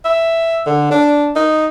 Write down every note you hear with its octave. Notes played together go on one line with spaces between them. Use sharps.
E5
D3
D4
D#4